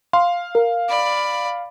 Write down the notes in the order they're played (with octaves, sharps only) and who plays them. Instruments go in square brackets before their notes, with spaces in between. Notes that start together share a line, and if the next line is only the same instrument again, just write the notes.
[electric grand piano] F5 [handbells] C6
[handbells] A#4
[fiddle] D5 B5